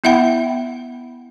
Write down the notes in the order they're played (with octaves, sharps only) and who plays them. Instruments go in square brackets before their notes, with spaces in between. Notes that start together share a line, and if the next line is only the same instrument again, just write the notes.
[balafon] B3 E4 E5 F#5 G5 B5